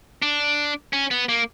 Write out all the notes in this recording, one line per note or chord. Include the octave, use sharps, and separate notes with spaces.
D4
C#4
B3
A#3